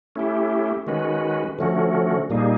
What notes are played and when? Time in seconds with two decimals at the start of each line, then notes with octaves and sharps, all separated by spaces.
0.16 A3 C#4 E4 G4
0.87 D#3 G#3 C#4 F#4 B4
1.59 D3 F3 A3 C#4 F#4
2.30 A#2 G3 A#3 D#4 G#4